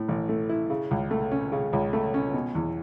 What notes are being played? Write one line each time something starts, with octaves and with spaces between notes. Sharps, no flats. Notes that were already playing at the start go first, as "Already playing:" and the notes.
Already playing: A2
A1
A3
E4
C#3
C#2
A3
C#4
C#3
C#2
A3
C#4
B2
E2